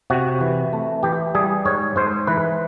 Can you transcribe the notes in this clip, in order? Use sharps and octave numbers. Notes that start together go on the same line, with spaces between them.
C3 F#4
E3
A3
E3 G4
G3 G#4
G#2 C#5
G#2 C5
E3 B4